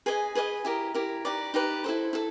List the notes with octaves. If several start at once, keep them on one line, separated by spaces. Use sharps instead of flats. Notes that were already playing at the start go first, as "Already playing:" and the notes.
G#4 B4 D#5 G#5
G#4 B4 D#5 G#5
E4 G4 A#4
E4 G4 A#4
D#4 G4 B4 D5
D#4 G4 B4 D5
E4 A4 C5
E4 A4